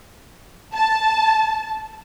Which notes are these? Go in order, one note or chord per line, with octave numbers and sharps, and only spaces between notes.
A5